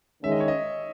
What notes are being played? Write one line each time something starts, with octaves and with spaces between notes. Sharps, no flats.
D#3 G#3 C#4 E5
D#5
C#5
D#5